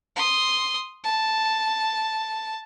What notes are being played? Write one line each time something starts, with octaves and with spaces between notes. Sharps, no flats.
C6 D#6
A5